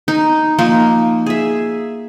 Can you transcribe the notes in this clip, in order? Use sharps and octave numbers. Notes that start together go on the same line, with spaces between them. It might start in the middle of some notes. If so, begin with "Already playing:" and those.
D#4
F3 A#3 D#4
G#4 E5